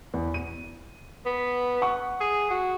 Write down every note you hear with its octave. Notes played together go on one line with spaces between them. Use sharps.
E2
D#7
B3
F#5 C#6
G#4
F#4